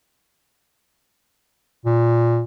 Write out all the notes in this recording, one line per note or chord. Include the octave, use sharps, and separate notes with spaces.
A#2